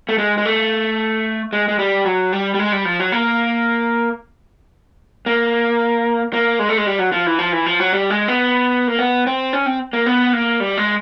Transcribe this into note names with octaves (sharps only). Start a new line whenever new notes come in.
A3
G#3
G#3
A3
G#3
G#3
G3
F#3
G3
G3
G#3
G3
F3
F#3
A#3
A#3
A#3
G#3
A3
G#3
G3
F#3
F3
E3
F3
E3
F3
F#3
G3
G#3
B3
A#3
B3
C4
C#4
C4
A#3
B3
A#3
G3
G#3